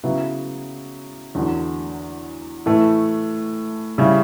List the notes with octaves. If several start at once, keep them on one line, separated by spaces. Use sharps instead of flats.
C#3 F#3 B3 E4
E2 D3 F#3
A2 E3 A3
C#3 G3 C#4 E4